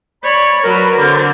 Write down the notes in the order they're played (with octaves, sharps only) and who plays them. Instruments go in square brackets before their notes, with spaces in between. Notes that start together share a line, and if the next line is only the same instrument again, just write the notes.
[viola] C#5 [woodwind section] D5 B5
[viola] F#3 B4 [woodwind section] A#4
[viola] D3 C4